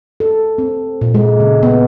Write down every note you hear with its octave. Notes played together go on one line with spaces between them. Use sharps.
A4
C4
A#2
G#3
C#3
B3